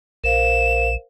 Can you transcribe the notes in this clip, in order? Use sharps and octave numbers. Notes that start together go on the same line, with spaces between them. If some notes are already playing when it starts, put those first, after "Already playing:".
A#1 A#4 C5 F5 E7